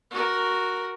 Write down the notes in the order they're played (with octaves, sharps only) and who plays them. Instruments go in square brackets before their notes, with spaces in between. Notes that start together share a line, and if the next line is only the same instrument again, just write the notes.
[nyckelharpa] F#4 A#4